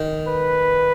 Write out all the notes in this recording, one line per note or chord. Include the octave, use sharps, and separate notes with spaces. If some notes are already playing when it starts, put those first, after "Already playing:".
Already playing: D#3
B4